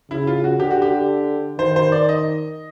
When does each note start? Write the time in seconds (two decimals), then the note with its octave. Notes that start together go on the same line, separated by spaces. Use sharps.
0.11 C#3 E4
0.27 F4
0.44 F#4
0.59 D3 G4
0.71 F#4
0.82 G4
1.59 D#3 C5
1.76 C5
1.92 D5
2.09 D#5